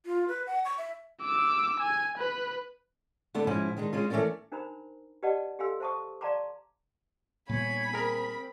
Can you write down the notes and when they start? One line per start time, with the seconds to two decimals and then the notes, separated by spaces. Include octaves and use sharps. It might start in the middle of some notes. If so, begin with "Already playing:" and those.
0.06 F4
0.28 B4
0.47 F#5
0.65 C#6
0.78 E5
1.22 D6 E6
1.80 G#5
2.18 B4
3.34 D3 A3 B3 D4
3.47 G#2 B2 F3 C#4 E4
3.77 D#3 G#3 D4 D#4
3.93 G#3 C#4 F4
4.10 E3 A3 C4 C#4 A#4 D5
4.52 D4 D#4 A#4 C5 A#5 B5
5.23 G4 B4 D5 D#5 F#5 A5
5.59 G4 A4 F5 G#5 C6 E6
5.80 C5 E5 A5 C#6 D#6
6.21 D5 F5 A5 A#5 C6 D6
7.49 A#2 G3 B3 C#5 G#5 B5
7.93 C4 G#4 A#4